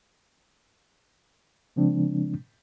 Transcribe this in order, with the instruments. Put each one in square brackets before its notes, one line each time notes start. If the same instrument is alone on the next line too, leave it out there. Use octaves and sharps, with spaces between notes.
[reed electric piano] C#3 F3 G#3 C4 D4